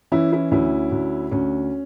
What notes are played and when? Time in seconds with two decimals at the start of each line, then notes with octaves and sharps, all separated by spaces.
0.12 E3 C#4 E4
0.32 C#4 E4
0.51 D2 C#4 E4
0.92 D2
1.32 D2 C#4